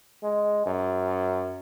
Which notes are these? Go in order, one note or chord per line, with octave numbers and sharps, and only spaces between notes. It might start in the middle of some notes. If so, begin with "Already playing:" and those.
G#3
F#2